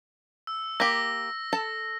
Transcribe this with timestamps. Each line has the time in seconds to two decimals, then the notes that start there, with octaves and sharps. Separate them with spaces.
0.47 E6
0.80 A#3 G4 A#6
1.53 A4 A5